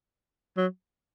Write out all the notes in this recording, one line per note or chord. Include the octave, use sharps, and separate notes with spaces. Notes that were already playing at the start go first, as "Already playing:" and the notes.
F#3